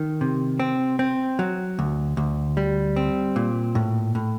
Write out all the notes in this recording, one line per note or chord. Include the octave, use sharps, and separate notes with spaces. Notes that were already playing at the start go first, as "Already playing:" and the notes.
Already playing: D#3
C3
C4
C4
F#3
D2
D2
G3
C4
A#2
A2
A2